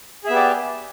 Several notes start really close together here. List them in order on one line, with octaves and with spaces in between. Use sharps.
G#4 E5 B3 G4 D5